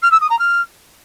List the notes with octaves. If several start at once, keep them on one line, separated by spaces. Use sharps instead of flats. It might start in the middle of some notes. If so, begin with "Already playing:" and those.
F6
E6
D#6
A#5
F6